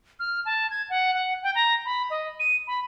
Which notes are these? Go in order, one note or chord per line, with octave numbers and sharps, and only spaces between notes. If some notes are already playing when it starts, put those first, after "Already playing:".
F6
A5
G#6
F#5
F#5
G5
A#5
B5
D#5
D#7
B5